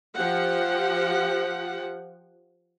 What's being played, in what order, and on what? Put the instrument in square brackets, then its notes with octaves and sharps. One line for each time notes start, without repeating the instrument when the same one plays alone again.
[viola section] F3 G4 F#5